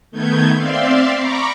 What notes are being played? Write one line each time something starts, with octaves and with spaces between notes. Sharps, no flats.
D#3 A3 B3 G6 G#6
C4 D5 E5 F5 C6
A#5 B5 C#6 D6